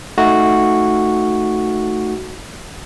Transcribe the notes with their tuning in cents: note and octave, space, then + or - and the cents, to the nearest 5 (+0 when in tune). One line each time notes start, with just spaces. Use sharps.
A3 +0 D#4 +0 F#4 -5